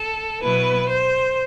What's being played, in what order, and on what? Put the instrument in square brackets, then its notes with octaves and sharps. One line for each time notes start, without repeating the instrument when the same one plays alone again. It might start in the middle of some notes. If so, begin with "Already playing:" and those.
Already playing: [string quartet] A4
B2 F#3 B3 E4 B4
C5